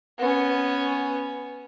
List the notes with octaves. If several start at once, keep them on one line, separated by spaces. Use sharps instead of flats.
B3 C#4